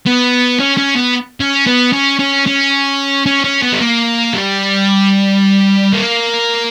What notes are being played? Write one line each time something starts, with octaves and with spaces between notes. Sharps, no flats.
B3
C#4
C#4
B3
C#4
B3
C#4
C#4
C#4
C#4
C#4
B3
G3
A#3
G3
A#3